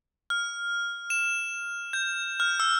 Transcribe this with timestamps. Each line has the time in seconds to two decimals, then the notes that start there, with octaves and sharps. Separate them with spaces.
0.30 F6
1.10 E7
1.93 G6
2.40 F6
2.60 E6